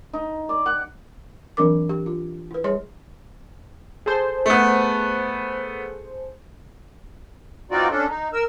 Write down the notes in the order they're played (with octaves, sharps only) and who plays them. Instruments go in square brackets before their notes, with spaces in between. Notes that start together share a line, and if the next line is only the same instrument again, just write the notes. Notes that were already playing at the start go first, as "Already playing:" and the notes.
[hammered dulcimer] D#4
D5
F#5
[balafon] E3 F#3 C4 D4 A#4 D6
G4
F4
E4 B4
G3 G#4 C#5 C6
[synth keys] G#4 A4 C5
[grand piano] A3 B3
[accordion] E3 C4 D#4 F4 F#4 D5
C#4 D4 A4
D#4
A#4 E6